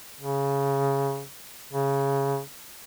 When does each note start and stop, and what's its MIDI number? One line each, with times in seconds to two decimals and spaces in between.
0.20 1.24 49
1.73 2.40 49